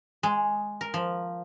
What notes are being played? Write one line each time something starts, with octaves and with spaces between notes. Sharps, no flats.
G#3
A#4
F3